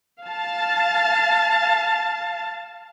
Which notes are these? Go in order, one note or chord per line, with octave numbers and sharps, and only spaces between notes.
F5 A5